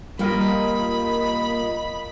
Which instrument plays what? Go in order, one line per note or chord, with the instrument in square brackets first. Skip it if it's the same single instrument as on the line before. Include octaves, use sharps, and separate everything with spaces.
[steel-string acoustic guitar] G3 A#3 [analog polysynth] F4 A#4 D#5 [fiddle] B5